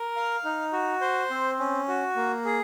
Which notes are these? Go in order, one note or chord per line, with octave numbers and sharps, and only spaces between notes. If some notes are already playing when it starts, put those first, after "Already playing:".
Already playing: A#4
F5
D#4
F#4
C5
C4
C#4
F#4
A#3
G#4